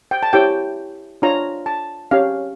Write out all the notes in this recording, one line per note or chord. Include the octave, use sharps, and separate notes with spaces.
G5
A5
E4 G4 C#5 G5
D4 F4 C#5 A#5
A5
C#4 G4 C#5 F5